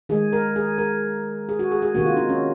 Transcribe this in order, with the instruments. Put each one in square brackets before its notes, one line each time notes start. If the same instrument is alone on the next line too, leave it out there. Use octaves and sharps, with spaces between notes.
[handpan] D#3 G#3 G#4
A#4
G#4
A#4
G#4
F#4
G#4
G#4
C3 D#3 A#3 F#4
F4
D#4
C#4